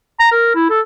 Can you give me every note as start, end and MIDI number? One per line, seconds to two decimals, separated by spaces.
0.19 0.29 82
0.32 0.50 70
0.55 0.67 64
0.70 0.80 69